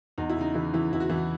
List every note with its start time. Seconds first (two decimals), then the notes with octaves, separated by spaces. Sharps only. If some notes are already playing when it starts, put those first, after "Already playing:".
0.18 E2 D#4
0.30 E4
0.36 C#3 D#4
0.55 C#3 E3 E4
0.74 C#3 E3 E4
0.92 E2 E4
1.00 F#4
1.10 E2 E3 E4